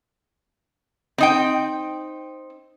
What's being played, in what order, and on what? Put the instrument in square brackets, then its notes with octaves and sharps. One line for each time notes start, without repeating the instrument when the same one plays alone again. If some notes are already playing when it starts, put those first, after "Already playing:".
[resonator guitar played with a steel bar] C4 D#4 G5